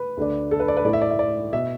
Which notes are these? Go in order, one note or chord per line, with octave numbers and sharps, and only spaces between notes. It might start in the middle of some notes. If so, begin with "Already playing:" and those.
Already playing: B4
D2 D3 A3 D4
A4
B4
D5
B4
A2 A3 E4 D5
E5
D5
E5
D5
B2 E5